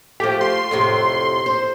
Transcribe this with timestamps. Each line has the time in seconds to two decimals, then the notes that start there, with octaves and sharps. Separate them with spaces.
0.20 F3 A3 G4
0.41 C6
0.71 F2 A2 C3
1.46 C5